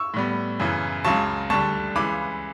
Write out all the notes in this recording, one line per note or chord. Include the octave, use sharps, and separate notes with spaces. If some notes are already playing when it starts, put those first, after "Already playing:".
Already playing: C#6 E6
A2 G3 B3
F#2 C#3 E3
C#2 C#3 F#3 A5 C#6
D2 D3 G3 A5 C#6
C#2 C#3 E3 B5 D6